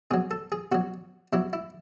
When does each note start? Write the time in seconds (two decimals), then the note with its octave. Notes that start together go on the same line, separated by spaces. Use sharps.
0.11 B2 F#3 G#4
0.31 A4
0.52 G#4
0.72 B2 F#3 F#4
1.33 B2 F#3 E4
1.53 E4